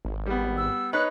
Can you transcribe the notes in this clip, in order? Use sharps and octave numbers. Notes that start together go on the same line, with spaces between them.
G#1
G3 B3
E6
D#4 B4 C#5 F#6